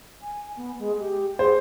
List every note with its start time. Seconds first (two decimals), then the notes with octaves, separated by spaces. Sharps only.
0.22 G#5
0.57 B3
0.79 G#3
1.00 G4
1.39 G#4 C5